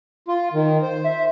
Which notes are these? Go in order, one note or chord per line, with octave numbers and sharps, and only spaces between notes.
F4
D#3
C5
E5